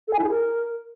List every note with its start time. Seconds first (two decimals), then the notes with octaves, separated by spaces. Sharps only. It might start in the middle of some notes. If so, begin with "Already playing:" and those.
0.08 A4
0.13 G#5
0.19 E4
0.24 G#4
0.30 A#4